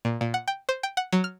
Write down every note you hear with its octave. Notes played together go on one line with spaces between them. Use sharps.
A#2
A#2
F#5
G5
C5
G5
F#5
F#3
F6